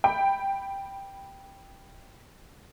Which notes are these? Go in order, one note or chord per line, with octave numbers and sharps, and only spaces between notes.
G5 B5